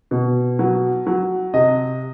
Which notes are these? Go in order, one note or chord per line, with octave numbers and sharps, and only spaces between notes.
B2
F#3
F#3
C3 D#5